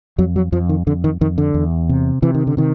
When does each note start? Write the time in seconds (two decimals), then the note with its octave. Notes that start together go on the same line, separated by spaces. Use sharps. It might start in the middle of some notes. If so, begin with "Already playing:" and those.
0.18 F2 F#3
0.36 F#3
0.52 F2 F3
0.69 D#3
0.87 F2 D3
1.04 D#3
1.21 F2 D#3
1.38 D3
1.54 E2
1.89 C3
2.22 C3 E3
2.34 D#3
2.47 D3
2.57 C3 D#3